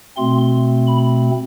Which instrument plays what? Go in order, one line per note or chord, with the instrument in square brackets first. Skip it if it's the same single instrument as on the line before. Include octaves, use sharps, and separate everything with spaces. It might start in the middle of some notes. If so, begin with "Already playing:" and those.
[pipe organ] B2 A3 C4 C6
B5